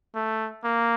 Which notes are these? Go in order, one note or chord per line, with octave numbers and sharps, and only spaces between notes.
A3
A#3